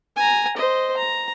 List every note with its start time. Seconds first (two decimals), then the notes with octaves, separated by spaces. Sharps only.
0.16 G#5 A#5
0.57 C5 D#5
0.97 A#5